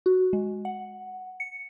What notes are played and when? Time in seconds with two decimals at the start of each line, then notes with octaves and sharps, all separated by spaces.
0.06 F#4
0.33 G#3
0.65 F#5
1.40 C#7